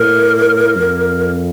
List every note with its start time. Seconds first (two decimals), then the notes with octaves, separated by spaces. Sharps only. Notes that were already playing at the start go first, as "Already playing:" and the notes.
Already playing: A2 A#4
0.76 F2